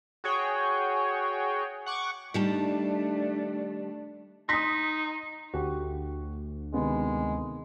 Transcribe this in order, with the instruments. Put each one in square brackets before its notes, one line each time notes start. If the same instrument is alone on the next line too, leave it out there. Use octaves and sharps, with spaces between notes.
[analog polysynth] F#4 G#4 C#5 G5
F#5 C#6 D6
[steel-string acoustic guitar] D#3 G3 A5 [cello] A3 D4
[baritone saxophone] D#4 [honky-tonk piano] C6 D#6 [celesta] A#6 B6
[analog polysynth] D2 [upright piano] F#4 G4
[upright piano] C3 D#3 B3 [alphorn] G#3